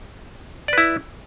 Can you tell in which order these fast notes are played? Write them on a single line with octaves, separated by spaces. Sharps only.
D5 B4 E4